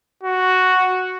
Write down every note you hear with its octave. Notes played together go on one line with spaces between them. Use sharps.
F#4